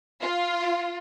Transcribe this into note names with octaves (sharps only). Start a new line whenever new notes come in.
F4